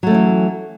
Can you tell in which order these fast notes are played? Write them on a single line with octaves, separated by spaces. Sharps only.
F#3 A3 C#4 E3